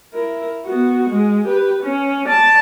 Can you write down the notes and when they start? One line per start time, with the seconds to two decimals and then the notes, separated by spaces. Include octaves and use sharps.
0.13 E4 A#4
0.66 B3 F#4
1.09 G#3
1.44 G4 B4
1.83 C#4
2.26 D5 A5